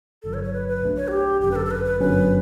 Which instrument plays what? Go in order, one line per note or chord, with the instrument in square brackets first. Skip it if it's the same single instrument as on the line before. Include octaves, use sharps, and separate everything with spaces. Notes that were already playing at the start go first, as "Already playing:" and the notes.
[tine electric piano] G1 G2 D3 F#3 [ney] A4
[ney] C#5
C#5
B4
B4
[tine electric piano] B1 B2 A3 D4
[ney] C#5
F#4
G4
[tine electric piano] G1 F#2 D3 [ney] G4
[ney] B4
A4
A4
B4
B4
[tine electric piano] G1 F#2 D3 F#3 C#4 [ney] B4